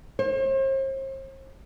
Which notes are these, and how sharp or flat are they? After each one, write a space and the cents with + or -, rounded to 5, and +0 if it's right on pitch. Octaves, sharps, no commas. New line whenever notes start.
C5 +40